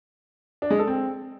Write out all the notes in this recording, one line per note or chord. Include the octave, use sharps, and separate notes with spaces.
D4
G#3
A4
C4